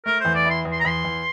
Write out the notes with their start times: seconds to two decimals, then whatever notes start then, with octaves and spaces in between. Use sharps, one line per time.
0.06 A3 A#4
0.21 E2 C5
0.35 D5
0.45 E4 C6
0.65 E2
0.72 C6
0.80 A#5
0.85 E2 C6
1.04 E2